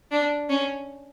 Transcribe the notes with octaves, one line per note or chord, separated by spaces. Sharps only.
D4
C#4